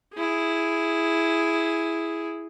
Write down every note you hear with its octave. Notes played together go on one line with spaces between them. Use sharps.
E4 G#4